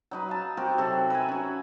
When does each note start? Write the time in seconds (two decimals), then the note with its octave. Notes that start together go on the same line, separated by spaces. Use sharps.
0.11 F#3 D#4 B4
0.29 F5 A5
0.57 C4 F#4 G4 A#4
0.78 C3 F#3 F#4 A4
1.10 B4 E5 F#5 G#5
1.29 C#4 F#4